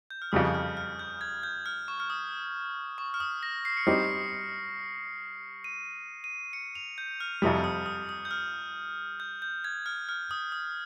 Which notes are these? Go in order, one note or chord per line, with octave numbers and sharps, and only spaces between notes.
G6
F6
F2 C#3 G3 D#6
F6
F6
G6
G#6
G6
F6
C#6
F6
D#6
C#6
F6
D#6
A#6
C7
C#7
G3 C4 D#4 G4 C7
D#7
D#7
C#7
F7
G6
F6
F2 C3 G3 D#6
D#6
D#6
D#6
G6
F6
G6
G6
G#6
F6
F6
D#6
D#6